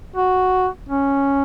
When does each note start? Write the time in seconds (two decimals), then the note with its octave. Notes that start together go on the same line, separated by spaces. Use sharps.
0.16 F#4
0.88 C#4